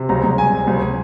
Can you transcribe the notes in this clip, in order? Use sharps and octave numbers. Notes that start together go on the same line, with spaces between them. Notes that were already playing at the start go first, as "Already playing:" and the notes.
Already playing: C3
C#2 A#5
C#2
G3 G#5
C3
C#2